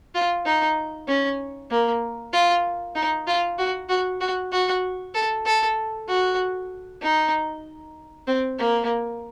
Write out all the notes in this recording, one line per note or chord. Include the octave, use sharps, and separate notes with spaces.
F4
D#4
C#4
A#3
F4
D#4
F4
F#4
F#4
F#4
F#4
A4
A4
F#4
D#4
C4
A#3